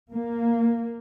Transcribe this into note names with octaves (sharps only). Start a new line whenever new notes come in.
A#3